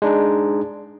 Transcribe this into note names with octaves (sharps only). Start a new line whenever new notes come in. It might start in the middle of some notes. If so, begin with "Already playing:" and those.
G#3 D4 D#4